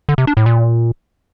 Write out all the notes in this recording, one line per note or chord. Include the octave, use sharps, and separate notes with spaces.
D3
C3
D4
A2
A#2